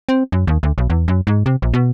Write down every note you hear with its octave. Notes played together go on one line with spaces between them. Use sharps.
C4
F#2
D#2
D2
B1
E2
F#2
G#2
C3
A#1
B2